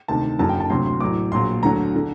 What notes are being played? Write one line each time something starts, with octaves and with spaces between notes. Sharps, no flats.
D2 C3 D#3 A5
F#1 F#2 D3 F#3 A5
G5
A5
D2 C3 F#3 C6
C6
A1 A2 F#3 D6
A#1 A#2 F#3 C6
D2 D3 F#3 A#5
D3